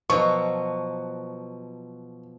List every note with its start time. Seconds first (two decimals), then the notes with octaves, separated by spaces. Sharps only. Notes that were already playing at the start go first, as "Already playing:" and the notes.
0.10 B2 F3 F#3 C#6